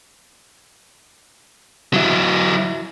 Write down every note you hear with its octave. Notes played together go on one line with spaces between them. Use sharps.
F#3 E4